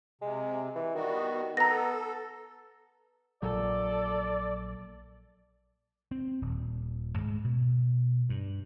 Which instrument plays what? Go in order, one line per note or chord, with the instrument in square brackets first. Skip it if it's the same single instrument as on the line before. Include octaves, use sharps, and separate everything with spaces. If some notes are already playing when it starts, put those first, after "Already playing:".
[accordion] C3 [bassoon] G#3
[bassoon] E3
[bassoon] D#3 [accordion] G3 B3 F#4
[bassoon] B3 [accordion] A4 [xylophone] A#5 A#6
[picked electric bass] A#1 A#2 F#3 [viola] A4 [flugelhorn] D5
[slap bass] C4
D#1
G#2
B2
G2